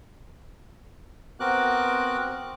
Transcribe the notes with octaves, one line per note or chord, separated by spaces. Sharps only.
B3 C4 F#4 A#4 D6 F#6